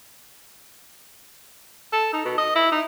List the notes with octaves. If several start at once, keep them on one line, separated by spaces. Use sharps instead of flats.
A4
D#4
B2
D#5
E4
D#4